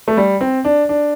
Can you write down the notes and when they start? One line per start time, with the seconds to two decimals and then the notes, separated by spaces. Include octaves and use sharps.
0.08 A3
0.17 G3
0.41 C4
0.65 D4
0.89 D4